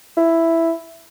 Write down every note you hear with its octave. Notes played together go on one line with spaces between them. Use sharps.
E4